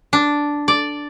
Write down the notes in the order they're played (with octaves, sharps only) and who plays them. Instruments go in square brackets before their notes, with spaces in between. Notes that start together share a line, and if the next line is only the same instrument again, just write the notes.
[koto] D4
D5